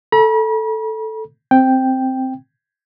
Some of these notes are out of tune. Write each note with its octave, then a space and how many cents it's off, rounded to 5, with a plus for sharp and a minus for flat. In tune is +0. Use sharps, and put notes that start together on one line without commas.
A4 +0 B5 -45
C4 +0 G5 +0